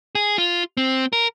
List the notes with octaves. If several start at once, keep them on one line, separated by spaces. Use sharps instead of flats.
G#4
F4
C4
A#4